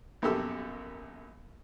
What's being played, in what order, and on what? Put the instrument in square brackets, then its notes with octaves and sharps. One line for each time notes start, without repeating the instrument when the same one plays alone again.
[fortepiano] A#1 F#2 B2 G4 A4 E6